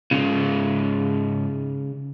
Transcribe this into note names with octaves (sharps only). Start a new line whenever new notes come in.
G#2 C#3 F4